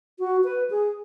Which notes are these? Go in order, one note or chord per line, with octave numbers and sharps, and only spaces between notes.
F#4
B4
G#4